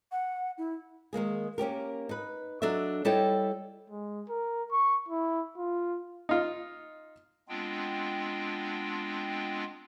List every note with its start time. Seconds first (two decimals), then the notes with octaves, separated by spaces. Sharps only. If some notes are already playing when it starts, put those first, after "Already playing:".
0.12 F#5
0.58 E4
1.13 D#3 G#3 A#3 G#4
1.58 A#3 C#4 G4 A#4
2.09 D#4 B4
2.62 F#3 D4 A4 D#5 E5
3.05 G3 E4 A4 C#5 D#5 G5
3.90 G#3
4.29 A#4
4.72 C#6
5.09 E4
5.57 F4
6.29 D#4 F4
7.49 G#3 B3 C4 D4 F4 G5